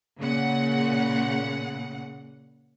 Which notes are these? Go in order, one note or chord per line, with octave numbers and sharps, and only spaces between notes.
A#2 C#3 F#5